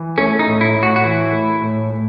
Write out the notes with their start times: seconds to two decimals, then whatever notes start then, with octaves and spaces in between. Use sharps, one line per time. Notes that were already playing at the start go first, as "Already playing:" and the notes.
Already playing: E3
0.18 A3 C#4
0.39 D#4
0.47 A2
0.61 E4
0.75 A2
0.83 F#4
0.96 F#4
1.04 E3 E4
1.32 A3
1.62 A2
1.90 A2